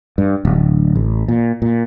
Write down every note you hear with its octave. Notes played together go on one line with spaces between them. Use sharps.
G2
D1
A1
A#2
A#2